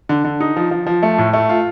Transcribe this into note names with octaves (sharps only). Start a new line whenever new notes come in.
D3
D3
D#4
F3
F3
F3
A3
A2
A3
F4